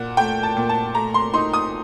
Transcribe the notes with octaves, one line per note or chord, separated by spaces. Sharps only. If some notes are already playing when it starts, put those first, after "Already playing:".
Already playing: A#2 F#5
A3 G5
A5
A#2
A5
A3 A#5
C6
D#4 C6
D#6